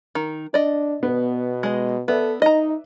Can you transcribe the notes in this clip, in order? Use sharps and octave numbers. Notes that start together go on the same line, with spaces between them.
D#3
D4 D5 D#5
B2 B3
G#3 D#5
B3 A4 B4 D5 E5
D#4 D#5 A#5